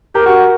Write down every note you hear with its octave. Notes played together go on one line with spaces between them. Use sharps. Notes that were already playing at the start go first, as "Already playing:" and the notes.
G4 A#4
F#4